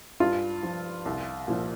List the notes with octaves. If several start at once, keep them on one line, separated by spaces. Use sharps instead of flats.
G2 F4
F3
C2
A#2 F3